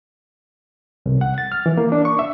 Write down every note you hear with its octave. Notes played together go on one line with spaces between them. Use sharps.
C2
F#5
A6
F6
E3
A#3
D4
C#6
E5